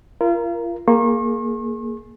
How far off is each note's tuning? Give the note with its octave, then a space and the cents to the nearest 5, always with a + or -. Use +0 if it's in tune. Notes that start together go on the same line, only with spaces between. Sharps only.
F4 -35 A#4 +5
A#3 +0 G#4 +15 C#6 -45